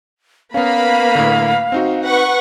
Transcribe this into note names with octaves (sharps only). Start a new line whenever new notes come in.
A#3 B3 C#4 B4 F5 B5
A2 D3
C4 D#4 F#4
B4 F#5 C#6